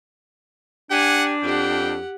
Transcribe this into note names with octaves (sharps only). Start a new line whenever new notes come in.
D4 G4 F#5 G#5
F2 G4 F#5 G5